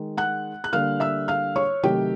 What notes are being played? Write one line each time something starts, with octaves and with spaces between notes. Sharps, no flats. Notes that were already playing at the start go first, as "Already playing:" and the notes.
Already playing: D#3 G#3
F#5 F#6
F#6
D3 G3 A#3 F5 F6
E5 E6
F5 F6
C#5 C#6
C3 D#3 F#3 A3 G4 G5